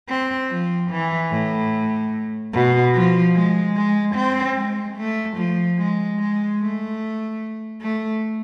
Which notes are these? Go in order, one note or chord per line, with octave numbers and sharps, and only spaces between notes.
C4
F3
E3
A2
B2
F3
G#3
G#3
C4
G#3
A3
F3
G#3
G#3
A3
A3